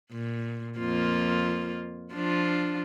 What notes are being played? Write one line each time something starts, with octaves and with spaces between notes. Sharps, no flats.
A#2
F2 A#3 F4
F3 D4 F4